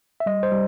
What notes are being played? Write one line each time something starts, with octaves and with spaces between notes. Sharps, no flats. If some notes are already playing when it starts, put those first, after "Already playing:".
E5
G3 D#5
C5
G3